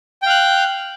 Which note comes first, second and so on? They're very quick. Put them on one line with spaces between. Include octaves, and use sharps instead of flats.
G5 F5 F#6